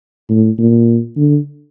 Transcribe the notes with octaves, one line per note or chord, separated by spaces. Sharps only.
A2
A#2
D3